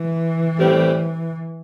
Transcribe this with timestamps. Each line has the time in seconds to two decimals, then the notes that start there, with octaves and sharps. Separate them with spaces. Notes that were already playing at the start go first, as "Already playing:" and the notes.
Already playing: E3
0.58 A2 G3 C4 G4